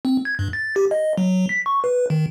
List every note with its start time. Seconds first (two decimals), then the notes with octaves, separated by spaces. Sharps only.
0.05 C4
0.25 G#6
0.39 G2
0.53 A6
0.76 G4
0.91 D#5
1.18 F#3
1.49 B6
1.66 C#6
1.84 B4
2.10 D#3